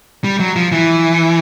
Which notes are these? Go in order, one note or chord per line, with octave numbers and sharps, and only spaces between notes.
G3
F#3
F3
E3